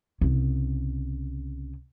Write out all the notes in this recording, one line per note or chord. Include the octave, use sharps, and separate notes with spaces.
C2 C#3